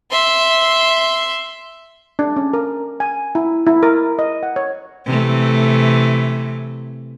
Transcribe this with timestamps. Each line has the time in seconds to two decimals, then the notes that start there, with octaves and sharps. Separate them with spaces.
0.11 E5 C6
2.19 D4
2.36 C#4
2.53 A#4
3.00 G#5
3.35 E4
3.66 E4
3.83 A#4
4.19 D#5
4.43 F#5
4.56 C#5
5.05 C3 E3 A3